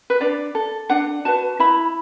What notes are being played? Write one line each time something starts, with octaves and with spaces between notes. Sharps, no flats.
B4
D4 D5
A4
D4 F#5
F#4 B4 A5
E4 B5